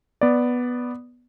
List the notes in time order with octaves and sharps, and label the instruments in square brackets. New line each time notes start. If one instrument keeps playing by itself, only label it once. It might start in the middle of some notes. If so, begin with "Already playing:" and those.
[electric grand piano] B3 D5